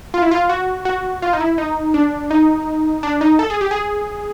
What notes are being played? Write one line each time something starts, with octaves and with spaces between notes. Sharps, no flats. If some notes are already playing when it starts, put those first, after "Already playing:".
F4
E4
F4
F#4
F#4
F4
D#4
E4
D#4
D4
D#4
D4
D#4
A4
G#4
G4
G#4